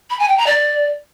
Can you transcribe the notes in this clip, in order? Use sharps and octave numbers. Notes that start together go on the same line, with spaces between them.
B5
G#5
G5
A#5
D5